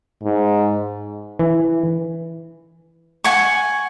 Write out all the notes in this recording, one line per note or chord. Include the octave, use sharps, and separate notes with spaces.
G#2
E3
F#5 G#5 C#6